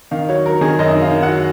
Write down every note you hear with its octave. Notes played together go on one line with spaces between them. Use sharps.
D#3 F5
F#3 C#5
F#3 A#4
D#3 G#4
F#2 D#5
D#3
F5
D#3
F#5
F#3